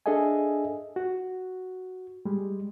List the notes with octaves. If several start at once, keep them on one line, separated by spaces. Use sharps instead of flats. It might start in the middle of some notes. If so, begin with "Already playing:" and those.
D4 G#4 A4 D#5 E5 G#5
F#4
G3 G#3